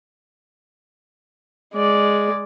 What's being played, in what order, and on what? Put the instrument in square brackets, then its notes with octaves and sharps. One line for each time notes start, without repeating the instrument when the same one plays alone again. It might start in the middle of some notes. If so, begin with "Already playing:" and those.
[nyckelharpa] G#3 D5